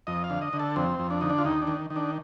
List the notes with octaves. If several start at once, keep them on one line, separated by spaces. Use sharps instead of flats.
F2 D#5
F5
D3
D#5
D3
A4
F2 C4
F2
D4
D3 D#4
D4
F4
D#2 D#4
D4
D#3
D#3
D4